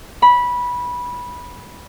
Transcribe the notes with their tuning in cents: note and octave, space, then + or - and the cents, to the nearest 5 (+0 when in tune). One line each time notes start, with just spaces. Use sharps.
B5 -15